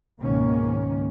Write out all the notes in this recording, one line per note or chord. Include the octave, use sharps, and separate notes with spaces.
C#2 G#2 B2 D#3 A#3 C#4